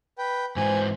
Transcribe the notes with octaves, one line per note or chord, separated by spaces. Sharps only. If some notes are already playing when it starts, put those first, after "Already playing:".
B4 G5
G#2 E3 C5 G#5